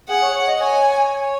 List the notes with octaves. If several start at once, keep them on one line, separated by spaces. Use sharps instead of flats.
G#4 F#5
C#5
C#5
D#5
C#5 G#5